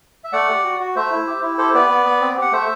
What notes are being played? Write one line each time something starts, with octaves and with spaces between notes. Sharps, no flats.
E5
A3 D5 F#5
G4
F#4
F#4
A3 C5 E5
E4
G4
E4
G4 A4 C5
B3 B4 D5
B3
B3
C4
G4 F#5
A3 C5 E5